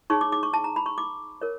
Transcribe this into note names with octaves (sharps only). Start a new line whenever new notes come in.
D#4 G#4 C#5 C#6
D6
D6
C#6
A5
A#5
B5
C#6
D6
A#4 C#5